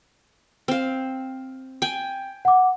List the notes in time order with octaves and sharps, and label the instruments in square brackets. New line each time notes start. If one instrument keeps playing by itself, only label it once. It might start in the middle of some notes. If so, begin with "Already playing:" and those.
[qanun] C4 F5
G5 G#5
[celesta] F#5 D6